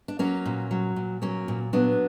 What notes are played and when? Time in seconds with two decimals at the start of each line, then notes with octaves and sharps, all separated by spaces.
0.08 D4
0.19 F#3 A#3 C#4
0.46 A#2
0.71 F#3
0.96 A#2
1.22 F#3 A#3 C#4
1.48 A#2
1.73 F#3 B3 D4